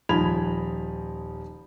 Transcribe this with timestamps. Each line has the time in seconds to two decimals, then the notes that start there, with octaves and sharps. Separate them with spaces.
0.09 D#1 F3 D#4 B5 G#6 F7